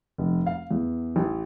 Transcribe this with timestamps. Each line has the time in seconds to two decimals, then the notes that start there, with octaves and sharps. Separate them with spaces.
0.18 F1
0.46 F5
0.71 E2
1.16 A1